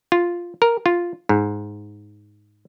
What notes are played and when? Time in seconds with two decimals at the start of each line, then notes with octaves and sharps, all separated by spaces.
0.12 F4
0.62 A#4
0.86 F4
1.29 G#2